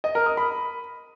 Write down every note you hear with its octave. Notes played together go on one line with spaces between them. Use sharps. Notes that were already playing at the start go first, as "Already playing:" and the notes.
D#5
A#4
D#6
B5